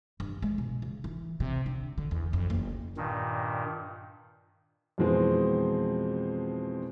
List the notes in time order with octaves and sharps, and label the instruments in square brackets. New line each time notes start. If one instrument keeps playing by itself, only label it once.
[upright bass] G2
G#3
B2
C#3
E3
C3
D3
D3
E2
F2
F#1
[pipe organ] G2 A#2 D#3
[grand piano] F2 B2 E3 G#3 B3 C4